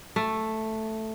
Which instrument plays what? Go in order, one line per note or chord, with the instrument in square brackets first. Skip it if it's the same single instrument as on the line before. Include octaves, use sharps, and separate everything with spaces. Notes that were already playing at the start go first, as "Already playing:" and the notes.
[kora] A3